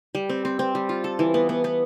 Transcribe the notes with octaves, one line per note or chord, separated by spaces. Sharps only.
G3
C4
C4
C4
G3
F4
A4
E3
B3
B3
B3